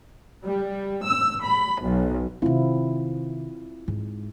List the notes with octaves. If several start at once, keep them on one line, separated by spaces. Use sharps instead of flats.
G3
E6
B5
B1
C3 D#3 C4 E4 F4
G#2